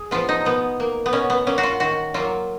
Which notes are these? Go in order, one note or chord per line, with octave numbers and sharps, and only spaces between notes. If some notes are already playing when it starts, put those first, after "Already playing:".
Already playing: G#4
F3 B3 F4
D#4
B2 B3
A#3
B3
B2 C#4
B3
A#3 C#4
F#4
F4
D#3 F#4
F#3 A#3 F4